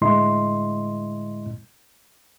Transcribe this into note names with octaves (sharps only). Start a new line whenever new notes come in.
A2 D3 G#3 E4 D#5 C6